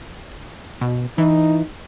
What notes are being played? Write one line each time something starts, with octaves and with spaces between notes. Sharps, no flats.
B2
E3 D#4